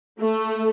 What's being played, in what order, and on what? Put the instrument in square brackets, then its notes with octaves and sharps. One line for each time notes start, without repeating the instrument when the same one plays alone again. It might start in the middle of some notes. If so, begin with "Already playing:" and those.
[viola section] A3